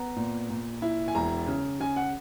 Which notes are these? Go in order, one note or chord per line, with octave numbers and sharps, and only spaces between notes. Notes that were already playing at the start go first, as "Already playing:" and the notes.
Already playing: B3 A#5
A#2
A#2
E4
G#5
E1 A#5
C#3
C#3 G#5
F#5